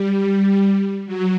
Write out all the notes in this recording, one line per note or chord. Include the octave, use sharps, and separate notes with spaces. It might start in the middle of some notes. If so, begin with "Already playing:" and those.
Already playing: G3
F#3